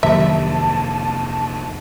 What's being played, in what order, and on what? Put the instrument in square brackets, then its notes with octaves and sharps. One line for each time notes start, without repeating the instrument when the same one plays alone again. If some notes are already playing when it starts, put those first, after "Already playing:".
[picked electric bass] F2 C3 A#3 [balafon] D#3 F#3 G4 [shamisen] E5 [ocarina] A5